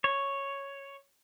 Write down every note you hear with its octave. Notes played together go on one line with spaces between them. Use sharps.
C#5